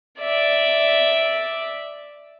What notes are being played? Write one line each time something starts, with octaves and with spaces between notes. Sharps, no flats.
D5 E5